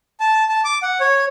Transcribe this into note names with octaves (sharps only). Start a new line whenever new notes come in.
A5
A5
D6
F#5
C#5